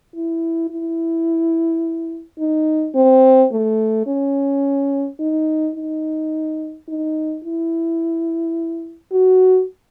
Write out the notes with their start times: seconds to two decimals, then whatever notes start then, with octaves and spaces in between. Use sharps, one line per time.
0.15 E4
0.70 E4
2.39 D#4
2.95 C4
3.52 A3
4.07 C#4
5.19 D#4
5.76 D#4
6.88 D#4
7.44 E4
9.11 F#4